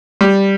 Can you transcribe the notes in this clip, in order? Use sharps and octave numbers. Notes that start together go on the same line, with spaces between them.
G3